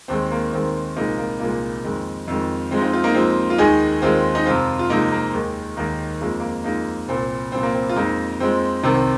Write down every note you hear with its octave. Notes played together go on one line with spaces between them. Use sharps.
D#2 D#3 G#3 C4
A#3
D#2 D#3 G#3 C4
C2 A#2 F3 G#3 A#3 D#4
A#3
C2 A#2 F3 G#3 A#3
F2 D#3 G#3
F2 D#3 G#3
F2 F3 G#3 C4
D#4
C4 F4
C4 F4
A#3 D#4
F2 F3 G#3 C4 F4
F4
D#2 D#3 G#3 D#4 G#4
D#2 D#3 G#3 C4 F4
D#4
F2 C3 F3 G#3 C4 F4
F4
F2 C3 F3 G#3 A#3 D#4
A#3
D#2 D#3 G#3
D#2 D#3 G#3 A#3 D#4
F2 F3 G#3 A#3
A#3
F2 F3 G#3 A#3 D#4
C2 A#2 F3 C4
C2 A#2 F3 C4
A#3
C4
F4
F2 F3 G#3 A#3 D#4
F2 F3 G#3 C4
C2 C3 D#3 C4